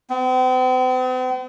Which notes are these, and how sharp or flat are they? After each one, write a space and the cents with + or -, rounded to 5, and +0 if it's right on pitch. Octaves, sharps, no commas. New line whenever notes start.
C4 -45